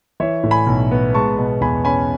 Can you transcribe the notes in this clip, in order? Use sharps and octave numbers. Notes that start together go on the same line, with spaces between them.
E3 C#5 E5
A2
G#5 B5
B1
B3
G#3 A5 C#6
B2
E2 G#5 B5
C#4 G#5 B5